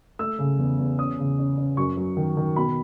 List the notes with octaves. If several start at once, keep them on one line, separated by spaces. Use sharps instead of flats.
A3 E6
C#3
E2
E2
C#4 D#6
C#3
C#4
C#4
F#2 C#6
F#3
D#3
D#3
B2 B5